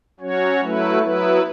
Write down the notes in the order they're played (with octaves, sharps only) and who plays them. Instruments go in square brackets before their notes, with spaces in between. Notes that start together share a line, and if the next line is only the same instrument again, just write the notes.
[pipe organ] F#3 C#4 F#4 C#5
F#3 A3 E4 B4
F#3 B3 E4 B4